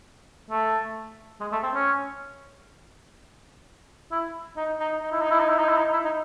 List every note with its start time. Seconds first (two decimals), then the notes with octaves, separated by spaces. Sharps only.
0.50 A3
1.40 G#3
1.52 A3
1.63 C4
1.74 C#4
4.12 E4
4.57 D#4
4.80 D#4
5.03 D#4
5.12 E4
5.22 D#4
5.31 E4
5.40 D#4
5.49 E4
5.59 D#4
5.68 E4
5.78 D#4
5.93 E4
6.04 D#4